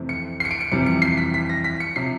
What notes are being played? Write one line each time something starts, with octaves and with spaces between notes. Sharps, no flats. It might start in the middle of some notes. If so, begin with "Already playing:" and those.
Already playing: F2 C3 E3 A3 C4
C#7
C7
C#7
D7
C#7
F2 C3 E3 G3 C#7
C#7
C7
B6
B6
A#6
B6
C#7
C3 F3 C7